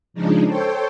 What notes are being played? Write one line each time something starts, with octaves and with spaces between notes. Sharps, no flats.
C#3 F3 G#3 D4 D#4
A4 C5 C#5 G5